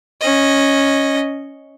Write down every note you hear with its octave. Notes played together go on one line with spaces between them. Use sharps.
C#4 D#5